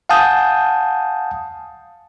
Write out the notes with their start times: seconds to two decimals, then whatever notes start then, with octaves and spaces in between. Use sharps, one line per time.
0.09 F5 F#5 G#5 A5 D#6 G6